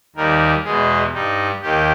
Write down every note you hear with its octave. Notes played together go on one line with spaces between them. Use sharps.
D#2 D#3 G3 A#4
E2 B2 G#3 G#4
G2 G3 D#4
D#2 D#3 G4